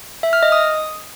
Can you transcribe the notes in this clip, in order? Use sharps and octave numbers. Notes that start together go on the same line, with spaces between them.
E5
F6
D#5
D#6